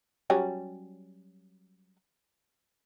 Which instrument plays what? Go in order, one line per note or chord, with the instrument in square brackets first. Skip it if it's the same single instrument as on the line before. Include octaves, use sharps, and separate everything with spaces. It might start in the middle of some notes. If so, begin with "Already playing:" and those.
[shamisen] F#3 G3 C#4